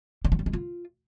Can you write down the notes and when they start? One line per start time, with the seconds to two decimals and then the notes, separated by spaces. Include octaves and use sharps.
0.25 D3
0.32 E3
0.39 G3
0.46 G#3
0.53 F4